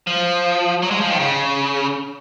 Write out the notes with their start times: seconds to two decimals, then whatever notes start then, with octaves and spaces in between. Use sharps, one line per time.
0.07 F3
0.82 F#3
0.91 G#3
1.01 F3
1.10 D#3
1.19 C#3